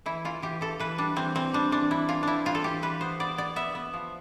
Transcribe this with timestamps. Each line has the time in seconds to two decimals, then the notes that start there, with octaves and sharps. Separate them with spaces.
0.06 E3 E4
0.25 E3 F4
0.42 E3 G4
0.61 E3 A4
0.80 E3 B4
0.98 G3 D4
1.16 E3 C4
1.35 E3 C4
1.53 G3 D4
1.72 E3 D4
1.91 E3 E4
2.09 E3 F4
2.23 C4 D4 E4
2.45 G3 F4
2.55 A4
2.64 E3 G4
2.82 E3 B4
3.01 B3 C5
3.20 B3 D5
3.38 B3 D5
3.56 B3 E5
3.75 B3
3.94 F3